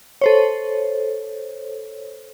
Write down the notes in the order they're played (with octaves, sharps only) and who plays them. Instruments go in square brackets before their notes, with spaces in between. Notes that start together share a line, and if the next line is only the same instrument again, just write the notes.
[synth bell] A4 C5 C#5